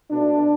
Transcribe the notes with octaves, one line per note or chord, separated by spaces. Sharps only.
B2 A3 D4